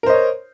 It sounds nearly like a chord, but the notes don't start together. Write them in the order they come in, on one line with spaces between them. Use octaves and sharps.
A#4 C5 D#5 C#5